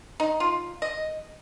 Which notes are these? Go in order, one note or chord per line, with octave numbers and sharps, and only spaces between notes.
D#4
F4
D#5